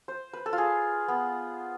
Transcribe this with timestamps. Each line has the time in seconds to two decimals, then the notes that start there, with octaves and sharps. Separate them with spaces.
0.08 C5
0.33 B4
0.46 A4
0.53 F4
0.58 G#4
1.08 B3